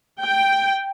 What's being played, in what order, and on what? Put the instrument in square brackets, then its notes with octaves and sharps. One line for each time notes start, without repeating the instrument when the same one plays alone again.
[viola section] G5